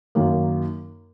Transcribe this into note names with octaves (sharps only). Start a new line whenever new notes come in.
F#2 D#3 F#3 A#3